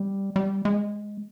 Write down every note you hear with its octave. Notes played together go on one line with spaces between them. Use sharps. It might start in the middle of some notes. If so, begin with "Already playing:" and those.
Already playing: G3
G3
G#3